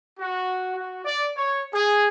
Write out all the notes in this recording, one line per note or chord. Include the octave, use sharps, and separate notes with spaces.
F#4
F#4
D5
C#5
G#4